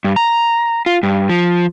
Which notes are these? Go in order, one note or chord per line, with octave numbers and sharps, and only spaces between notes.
G2
A#5
F4
G2
F3